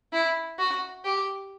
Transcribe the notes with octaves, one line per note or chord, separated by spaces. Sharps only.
E4
F#4
G4